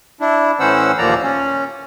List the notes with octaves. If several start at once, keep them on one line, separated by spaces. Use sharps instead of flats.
D4 E4
A2 E3 C#4 C5 F#5 E6
D#2 A#2 F3 A#3 D5 A#5
C#4